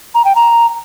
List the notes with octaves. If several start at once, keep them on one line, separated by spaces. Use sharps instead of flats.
A#5
G5
A#5